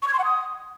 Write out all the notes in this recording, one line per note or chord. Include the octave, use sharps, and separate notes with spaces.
C#6
G#6
C6
F#5
D#6